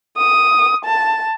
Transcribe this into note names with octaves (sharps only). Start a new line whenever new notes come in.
D#6
A5